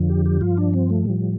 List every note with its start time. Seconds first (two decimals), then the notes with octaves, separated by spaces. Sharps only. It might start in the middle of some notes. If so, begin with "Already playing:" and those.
Already playing: F2 D3 F3
0.10 G4
0.26 G4
0.41 G2 F3 F4
0.57 D4
0.74 C4
0.90 A3
1.05 A2 F3 G3